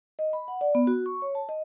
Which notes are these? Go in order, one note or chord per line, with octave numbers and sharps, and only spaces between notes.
D#5
B5
F#5
D5
B3
F#4
C#6
C#5
A5
D#5